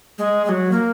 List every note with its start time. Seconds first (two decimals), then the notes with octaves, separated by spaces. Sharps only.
0.18 G#3
0.45 G#3
0.49 F#3
0.72 A#3